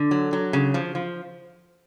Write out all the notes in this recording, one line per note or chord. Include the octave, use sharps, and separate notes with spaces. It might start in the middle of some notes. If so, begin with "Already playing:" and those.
Already playing: D3
F#3
F#3
C#3
F3
F3